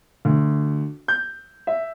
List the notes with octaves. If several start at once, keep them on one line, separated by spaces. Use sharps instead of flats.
D2
G6
E5